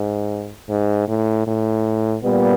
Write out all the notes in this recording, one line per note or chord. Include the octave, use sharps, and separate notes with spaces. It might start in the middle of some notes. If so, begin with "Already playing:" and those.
Already playing: G#2
G#2
A2
A2
A#2 G3 B3